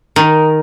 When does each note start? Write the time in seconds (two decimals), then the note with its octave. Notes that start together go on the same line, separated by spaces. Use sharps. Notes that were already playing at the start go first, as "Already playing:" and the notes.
0.16 D#3